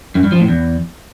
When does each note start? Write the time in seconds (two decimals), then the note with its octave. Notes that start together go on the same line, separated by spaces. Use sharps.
0.15 F#2
0.24 G2
0.32 F3
0.40 A2
0.48 E2